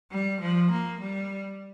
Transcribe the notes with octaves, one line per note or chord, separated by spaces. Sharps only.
G3
F3
A#3
G3